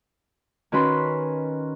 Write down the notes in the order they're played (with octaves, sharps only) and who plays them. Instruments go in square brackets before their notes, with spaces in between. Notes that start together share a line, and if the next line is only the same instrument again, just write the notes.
[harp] D#3 C#4 F#4 B4 B5 C6